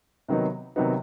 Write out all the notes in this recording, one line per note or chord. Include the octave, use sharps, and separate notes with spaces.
C3 D#3 F#3 B3 D#4
C3 D#3 F#3 B3 D#4